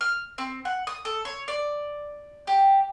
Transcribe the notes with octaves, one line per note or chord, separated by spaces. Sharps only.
F6
C4
F#5
D#6
A4
C#5
D5
G4